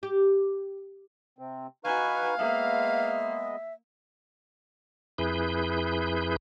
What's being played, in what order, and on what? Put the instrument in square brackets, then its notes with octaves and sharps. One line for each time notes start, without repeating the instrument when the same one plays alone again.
[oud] G4
[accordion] C3 C4
[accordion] D#4 B4 C#6 [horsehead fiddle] F#4 G#5 [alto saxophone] F5
[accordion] G#3 B3 D#5 [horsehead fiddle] A#3 [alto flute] E5
[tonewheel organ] F2 E4 G#4 B4 G6